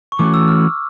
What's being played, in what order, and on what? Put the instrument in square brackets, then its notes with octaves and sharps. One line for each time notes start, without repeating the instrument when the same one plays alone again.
[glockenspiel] C#6
[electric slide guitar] E3 A3 C#4 F#4 [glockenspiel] D6
[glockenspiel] E6
F6